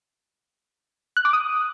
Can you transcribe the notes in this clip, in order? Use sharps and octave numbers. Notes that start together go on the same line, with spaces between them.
F#6
D6
D#6